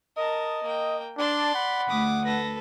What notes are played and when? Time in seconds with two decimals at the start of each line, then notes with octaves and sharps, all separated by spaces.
0.16 A#4 D#5 A5
0.63 A#3 G5
1.18 D4 D5 A5 C6
1.55 F#5 B5
1.89 D2 D6 D#6
2.25 A4 B4 A#6